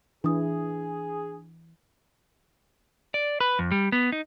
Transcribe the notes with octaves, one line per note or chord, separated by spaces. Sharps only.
E3 D4 G#4 D#6
D5
B4
F2
G3
B3
D#4